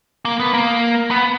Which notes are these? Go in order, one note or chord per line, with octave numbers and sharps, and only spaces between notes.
A#3
B3
A#3
B3